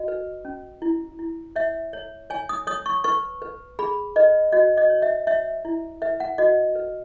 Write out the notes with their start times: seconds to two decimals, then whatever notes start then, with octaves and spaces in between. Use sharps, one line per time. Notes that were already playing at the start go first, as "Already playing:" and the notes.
Already playing: F#4 D#5
0.08 B4
0.45 C#4
0.82 E4
1.19 E4
1.56 C#5 E5
1.93 C#5
2.30 C#5 G#5
2.49 D#6
2.67 C#5 D#6
2.86 C#6
3.04 B4 C#6
3.42 B4
3.79 G#4 B5
4.16 B4 D#5
4.52 F#4 D#5
4.77 D#5
4.90 C#5
5.02 E5
5.27 C#5 E5
5.65 E4
6.02 B4 E5
6.20 F#5
6.38 F#4 D#5
6.75 B4